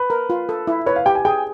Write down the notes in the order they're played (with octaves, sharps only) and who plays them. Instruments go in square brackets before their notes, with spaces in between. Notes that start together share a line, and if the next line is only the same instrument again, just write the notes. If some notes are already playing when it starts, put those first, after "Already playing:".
Already playing: [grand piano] B4
[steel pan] A#4
F4
A4
E4
[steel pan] B4 [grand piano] C#5
[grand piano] F5
[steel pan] G4 [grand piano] G5
[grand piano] G#5
[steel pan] G#4 [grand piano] G5